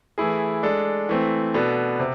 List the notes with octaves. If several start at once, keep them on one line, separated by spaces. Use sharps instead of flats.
E3 A3 E4 G#4
G#3 D4 A4
E3 A3 C4
B2 B3 D4 A4
C3